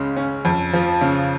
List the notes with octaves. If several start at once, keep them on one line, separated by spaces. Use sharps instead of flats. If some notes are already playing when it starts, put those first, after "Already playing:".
Already playing: C#2 C#3 G#3
C#4
F2
F3
C#3